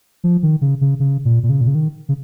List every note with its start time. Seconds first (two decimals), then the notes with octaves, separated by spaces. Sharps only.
0.24 F3
0.43 D#3
0.61 C#3
0.81 C#3
1.00 C#3
1.25 A#2
1.43 A#2
1.50 C#3
1.61 A#2
1.68 C#3
1.75 D#3
2.09 C#3